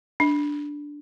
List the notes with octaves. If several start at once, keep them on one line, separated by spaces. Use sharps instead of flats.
D4